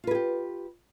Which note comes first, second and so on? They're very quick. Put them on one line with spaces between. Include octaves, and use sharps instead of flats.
F4 B4 G#4 G4